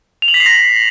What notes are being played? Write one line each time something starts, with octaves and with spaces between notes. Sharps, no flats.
F7
F#7
B6
C7
A#6